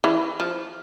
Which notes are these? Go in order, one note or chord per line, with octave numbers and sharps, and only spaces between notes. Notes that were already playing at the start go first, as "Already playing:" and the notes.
E3
F3